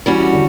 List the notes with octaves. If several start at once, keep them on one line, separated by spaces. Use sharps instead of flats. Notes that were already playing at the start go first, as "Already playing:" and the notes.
E3 G3 C#4 F#4
D3